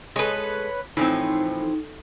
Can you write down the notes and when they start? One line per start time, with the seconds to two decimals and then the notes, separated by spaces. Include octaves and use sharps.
0.16 G#3 A4 B4 C#5
0.97 A2 E3 F3 C4 D#4